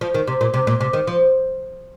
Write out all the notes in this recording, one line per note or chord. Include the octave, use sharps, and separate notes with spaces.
F3
D#3
C3
A#2
C3
A#2
C3
D#3
F3